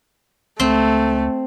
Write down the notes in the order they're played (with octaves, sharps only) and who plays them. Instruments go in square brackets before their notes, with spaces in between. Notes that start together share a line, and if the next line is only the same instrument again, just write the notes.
[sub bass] C#2 [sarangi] A3 [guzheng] C4